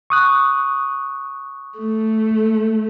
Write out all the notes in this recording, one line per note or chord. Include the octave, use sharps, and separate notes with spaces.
C#6 D#6 F#6
A3